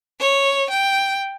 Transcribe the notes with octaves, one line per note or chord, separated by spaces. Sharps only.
C#5
G5